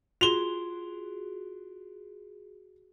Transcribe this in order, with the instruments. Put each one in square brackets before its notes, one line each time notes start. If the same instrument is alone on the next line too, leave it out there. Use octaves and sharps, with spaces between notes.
[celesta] F4 C6 E7 [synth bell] F#4 G#4 [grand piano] F7 G7